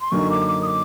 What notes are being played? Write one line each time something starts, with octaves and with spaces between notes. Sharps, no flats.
C6
F#2 D3 F#3 A#3 D#4 C#6
D6
D6
D#6
D6